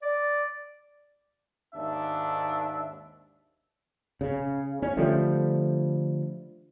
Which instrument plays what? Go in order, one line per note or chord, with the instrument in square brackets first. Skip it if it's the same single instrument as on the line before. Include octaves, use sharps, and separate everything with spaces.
[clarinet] D5
[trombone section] D#2 G#2 D4 [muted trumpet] E5
[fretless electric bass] C#3
C#4
D3 F3 G3 A3